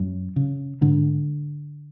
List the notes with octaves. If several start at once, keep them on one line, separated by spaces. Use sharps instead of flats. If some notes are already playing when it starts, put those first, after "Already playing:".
Already playing: F#2
C#3
G#2 D3